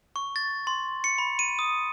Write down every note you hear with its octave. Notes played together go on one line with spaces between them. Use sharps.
C#6
A6
C6
C#7
B5
D#7
D#6